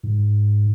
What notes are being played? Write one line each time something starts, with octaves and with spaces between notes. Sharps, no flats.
G#2